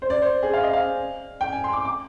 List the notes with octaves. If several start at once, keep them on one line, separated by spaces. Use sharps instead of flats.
C5
D5
C5
G#4
F5
D#5
F5
G5
G#5
C6
D6
D6